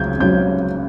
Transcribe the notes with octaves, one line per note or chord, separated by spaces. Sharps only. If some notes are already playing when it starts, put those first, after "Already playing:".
Already playing: C#2 C#3 F#3 G6 G#6
C#2 C#3 F#3 G6